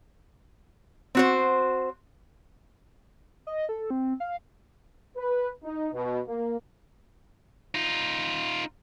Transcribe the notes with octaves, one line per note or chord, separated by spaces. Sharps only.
C4 F#4 C5
D#5
A4
C4
F5
B4
D#4
B2
A#3
D#4 F4